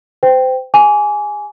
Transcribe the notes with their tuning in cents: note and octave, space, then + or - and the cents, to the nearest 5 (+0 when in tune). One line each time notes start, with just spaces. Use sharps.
C5 -30 G5 +0
G4 +45 G#5 +5 D6 -30